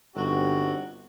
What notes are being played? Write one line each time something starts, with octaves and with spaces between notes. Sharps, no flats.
G1 C3 D#4 F#4